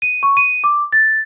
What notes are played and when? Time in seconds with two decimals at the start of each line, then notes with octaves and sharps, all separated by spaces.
0.02 D#7
0.23 C#6
0.37 D#7
0.64 D6
0.92 A6